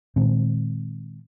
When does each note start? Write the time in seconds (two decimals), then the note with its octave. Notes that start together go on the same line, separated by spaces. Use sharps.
0.16 A#2 D#3 G#3 C4